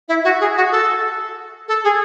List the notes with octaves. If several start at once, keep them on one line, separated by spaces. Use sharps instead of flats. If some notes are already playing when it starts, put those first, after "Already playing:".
E4
F#4
G#4
F#4
A4
A4
G#4